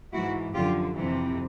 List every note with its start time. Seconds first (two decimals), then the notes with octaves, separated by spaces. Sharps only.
0.13 G#2 E3 E4 F#4
0.53 F#2 D3 F3 F4 G4
0.94 F2 C3 E3